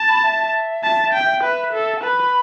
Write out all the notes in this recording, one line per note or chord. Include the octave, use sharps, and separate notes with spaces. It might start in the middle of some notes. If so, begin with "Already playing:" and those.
Already playing: A5
B5
E5
A5
G5
B4 E5
A4
A5
B4 B5